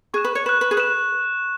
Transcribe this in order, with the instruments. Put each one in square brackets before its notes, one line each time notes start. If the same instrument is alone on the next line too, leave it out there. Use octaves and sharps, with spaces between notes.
[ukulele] G#4 [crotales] C#6 F#6 E7
[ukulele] B4
C#5
[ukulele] B4 [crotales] F#6 E7
[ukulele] B4
G#4
[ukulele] B4 [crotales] F#6 E7